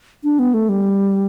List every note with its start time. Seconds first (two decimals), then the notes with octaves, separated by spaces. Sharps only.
0.24 D4
0.39 B3
0.54 A3
0.69 G3